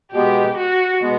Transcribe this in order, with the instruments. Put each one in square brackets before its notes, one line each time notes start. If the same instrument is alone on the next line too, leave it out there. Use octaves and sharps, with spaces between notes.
[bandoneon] B2 G#3 B3 [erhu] G4
[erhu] F#4
[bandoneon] B2 G#3 B3